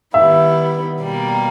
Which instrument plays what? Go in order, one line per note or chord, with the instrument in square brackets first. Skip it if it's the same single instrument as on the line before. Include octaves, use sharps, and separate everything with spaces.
[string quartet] D#3 G3 B3 E4 [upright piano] E5
[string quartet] B2 G3 A#3